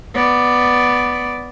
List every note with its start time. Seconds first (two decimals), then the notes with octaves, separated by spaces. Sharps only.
0.15 B3 D5